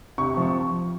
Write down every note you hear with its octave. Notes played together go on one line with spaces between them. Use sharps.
C3 C#6
F3
C#6